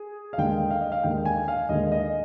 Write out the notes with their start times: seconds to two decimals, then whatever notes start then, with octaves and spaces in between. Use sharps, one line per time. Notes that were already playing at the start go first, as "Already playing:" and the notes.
Already playing: G#4
0.33 F5
0.38 D#2 D3 G#3 G5
0.71 F5
0.81 D#5
0.92 F5
1.03 D#2 D3 G#3 G5
1.25 G#5
1.48 F5
1.69 D#2 D3 G#3 D#5
1.92 D#5